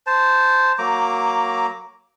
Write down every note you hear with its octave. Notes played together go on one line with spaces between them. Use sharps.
C5 A5
F#3 A#3 A#5 D6